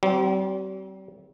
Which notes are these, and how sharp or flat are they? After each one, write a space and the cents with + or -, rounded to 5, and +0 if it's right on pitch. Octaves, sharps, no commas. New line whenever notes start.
G3 -45 C4 +0